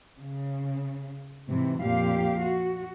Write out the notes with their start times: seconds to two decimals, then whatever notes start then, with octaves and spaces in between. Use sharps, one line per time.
0.20 C#3
1.47 G#2 C3 E3
1.81 F2 A#2 G4 F5
2.41 F#4